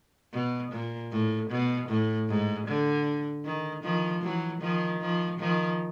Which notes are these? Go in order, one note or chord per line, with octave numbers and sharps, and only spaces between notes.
B2
A#2
A2
B2
A2
G#2
D3
D#3
D#3 F3
E3 F#3
D#3 F3
D#3 F3
D#3 F3